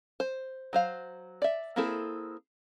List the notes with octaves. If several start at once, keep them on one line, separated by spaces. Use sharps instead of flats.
C5
F#3 C5 F5
D5 E5
A#3 C4 E4 G#4 A4